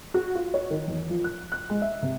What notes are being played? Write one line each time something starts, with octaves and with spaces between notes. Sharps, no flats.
F#4
F4
C#5
D#3
E2
F3
F#6
F#6
G#3
E5
C3